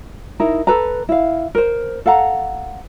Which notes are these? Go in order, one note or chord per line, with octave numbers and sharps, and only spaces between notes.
D#4 E4 A#4
A4 B4 A#5
E4 F5
A#4 C5
A4 F5 F#5 A#5